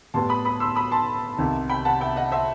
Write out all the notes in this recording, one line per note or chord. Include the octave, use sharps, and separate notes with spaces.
A2 G3 B3 A5 C6
B5 D#6
B5 D#6
C6 E6
B5 D#6
A5 C6
C2 C3 D#3
G5 B5
F#5 A5
E5 G5
D#5 F#5
C5 E5